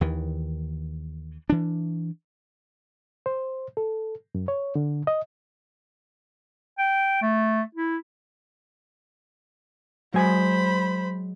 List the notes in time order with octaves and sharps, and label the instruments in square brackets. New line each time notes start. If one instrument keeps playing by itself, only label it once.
[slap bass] D#2 D#3 E3
E3 D4
[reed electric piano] C5
A4
F#2
C#5
D3
D#5
[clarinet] G5
A3
E4
[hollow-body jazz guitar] F#3 G#3 G#5 [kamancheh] C5 B5